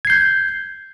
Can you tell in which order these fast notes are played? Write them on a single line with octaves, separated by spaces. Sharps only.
G#6 C7 G6